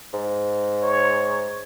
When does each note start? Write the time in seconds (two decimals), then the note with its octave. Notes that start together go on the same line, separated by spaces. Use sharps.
0.13 G#2
0.83 C#5